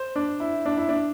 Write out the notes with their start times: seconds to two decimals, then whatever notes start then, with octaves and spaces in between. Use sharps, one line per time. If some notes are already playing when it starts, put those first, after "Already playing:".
Already playing: C5
0.16 D4
0.40 E4
0.66 D4
0.77 E4
0.89 D4